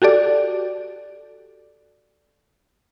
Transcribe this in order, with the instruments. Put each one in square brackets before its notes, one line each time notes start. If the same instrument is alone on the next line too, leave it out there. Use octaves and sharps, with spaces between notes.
[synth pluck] F#4 G4 A4 D5